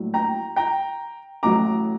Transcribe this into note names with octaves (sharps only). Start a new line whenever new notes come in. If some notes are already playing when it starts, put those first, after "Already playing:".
Already playing: A#1 A2 F#3
G5 A#5
G5 A#5
A1 A2 F#3 A#5 D6